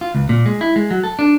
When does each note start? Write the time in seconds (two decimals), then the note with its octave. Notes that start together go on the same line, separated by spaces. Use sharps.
0.01 F4
0.15 C#2
0.29 A#2
0.46 G#3
0.61 E4
0.76 G#3
0.90 F#3
1.04 A4
1.19 D4